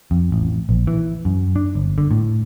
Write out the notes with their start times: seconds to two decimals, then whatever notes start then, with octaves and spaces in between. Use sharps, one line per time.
0.11 F2
0.32 A1
0.69 A#1
0.87 E3
1.25 F#2
1.56 D4
1.75 G1
1.98 D3
2.11 A2